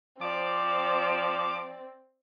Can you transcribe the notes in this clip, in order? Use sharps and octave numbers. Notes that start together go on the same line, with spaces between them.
F3 C4 D5 D6